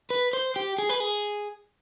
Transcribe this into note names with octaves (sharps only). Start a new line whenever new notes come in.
B4
C5
G4
G#4
B4
G#4